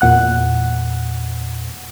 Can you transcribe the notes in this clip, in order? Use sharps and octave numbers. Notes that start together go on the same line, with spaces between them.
E2 A#2 F#5 F#6